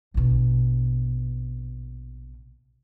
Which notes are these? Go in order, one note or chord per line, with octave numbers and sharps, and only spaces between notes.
A#1 B2